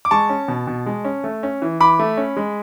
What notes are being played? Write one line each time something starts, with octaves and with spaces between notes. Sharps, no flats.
D6
G#3 A5 C#6
C#4
B2
B2
G#3
C#4
A3
C#4
E3
E3 B5 D6
A3
C#4
G#3